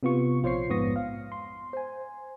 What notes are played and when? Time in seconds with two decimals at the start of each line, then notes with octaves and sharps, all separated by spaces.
0.03 C3 B3 F4 C#6
0.43 A#1 F4 C5 C#5 C#6 C7
0.69 F2 G#2 B3 C#6 D#6 A#6
0.96 F5
1.32 C6
1.73 C5 G#5